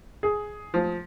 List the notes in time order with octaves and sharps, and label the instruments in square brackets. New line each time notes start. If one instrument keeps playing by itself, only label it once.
[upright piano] G#4
[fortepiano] F3